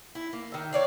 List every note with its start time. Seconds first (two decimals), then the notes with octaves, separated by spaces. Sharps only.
0.15 E4
0.33 A#3
0.52 D#3 E5
0.73 C#5 D5 F5